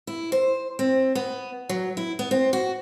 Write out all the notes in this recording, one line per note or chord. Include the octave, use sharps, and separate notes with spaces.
E4
C5
C4
B3
F#3
E4
B3
C4
F#4